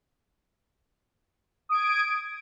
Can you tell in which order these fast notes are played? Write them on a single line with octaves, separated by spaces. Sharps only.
D#6 D7 G#6